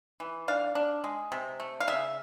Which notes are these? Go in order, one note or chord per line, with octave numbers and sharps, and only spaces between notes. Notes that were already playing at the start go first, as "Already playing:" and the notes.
E3
D4 F5
D4
G#3
C3
A3
F5
C#3 E5